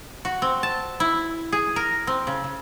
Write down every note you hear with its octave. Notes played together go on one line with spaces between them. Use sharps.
F#4
C4
A5
E4
G#4
A#4
C4
C#3
C#3